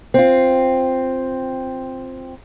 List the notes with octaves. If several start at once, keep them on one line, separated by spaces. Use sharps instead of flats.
C4 F4